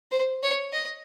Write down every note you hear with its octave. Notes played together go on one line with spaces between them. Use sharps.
C5
C#5
D#5